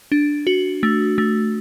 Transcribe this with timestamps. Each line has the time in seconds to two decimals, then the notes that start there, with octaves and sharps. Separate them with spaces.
0.12 D4
0.47 F#4
0.83 A3
1.18 A3